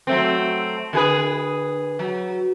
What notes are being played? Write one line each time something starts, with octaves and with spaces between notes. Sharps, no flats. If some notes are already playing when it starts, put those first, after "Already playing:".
F#3 A3 C4
D3 G#4 B4
F#3